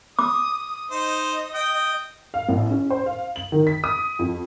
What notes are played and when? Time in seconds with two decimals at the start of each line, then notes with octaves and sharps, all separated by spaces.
0.19 D6 D#6
0.91 D#4 C5 D#5
1.54 G5 D#6
2.34 F5
2.49 A1
2.71 C#4
2.90 C5
3.06 F5
3.36 F#7
3.52 D#3
3.67 B6
3.84 D#6
4.19 F2